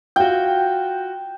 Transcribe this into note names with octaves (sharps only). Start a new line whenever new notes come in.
F4 F#4 G5